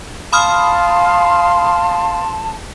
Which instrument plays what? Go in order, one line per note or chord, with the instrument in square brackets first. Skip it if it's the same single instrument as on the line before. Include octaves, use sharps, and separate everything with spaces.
[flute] F5 [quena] A5 [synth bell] B5 D#6 F6 [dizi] C6